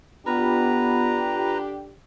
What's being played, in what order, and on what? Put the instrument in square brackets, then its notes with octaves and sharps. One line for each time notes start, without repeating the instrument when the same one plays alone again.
[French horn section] D3 D4 G4 [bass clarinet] B3 [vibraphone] F4 B5 [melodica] B4 A#5